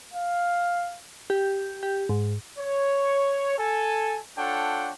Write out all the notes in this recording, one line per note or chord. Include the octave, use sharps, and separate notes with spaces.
F5
G4
G4
G#2
C#5
A4 G#5
D4 F4 A4 C#5 F#5 G5